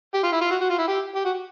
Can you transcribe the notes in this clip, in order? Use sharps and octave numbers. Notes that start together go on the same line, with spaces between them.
G4
F4
E4
F4
F#4
F#4
F4
E4
G4
G4
F#4